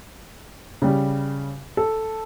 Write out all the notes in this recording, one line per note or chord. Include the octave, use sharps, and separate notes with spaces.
C#3 G3
A4